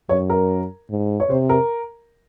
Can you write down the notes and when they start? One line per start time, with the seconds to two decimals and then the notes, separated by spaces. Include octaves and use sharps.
0.09 F#2 C#5
0.30 A#4
0.90 G#2
1.20 C#5
1.30 C3 C5
1.49 A#4